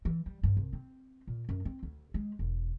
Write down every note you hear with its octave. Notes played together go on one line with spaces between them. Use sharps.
E3
G3
G2
C2
C4
A#2
F#2
C4
D2
G#3
E1